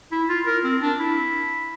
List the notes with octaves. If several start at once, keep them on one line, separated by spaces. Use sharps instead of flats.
E4
F4
A#4
C4
D4
E4